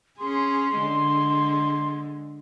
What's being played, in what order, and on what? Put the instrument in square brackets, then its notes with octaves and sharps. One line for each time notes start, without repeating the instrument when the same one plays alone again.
[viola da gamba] C#4 G#4 [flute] C6
[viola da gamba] D3 G#3